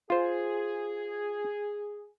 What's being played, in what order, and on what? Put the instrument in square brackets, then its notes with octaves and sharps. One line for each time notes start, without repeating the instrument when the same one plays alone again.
[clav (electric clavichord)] F4 C5 [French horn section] G#4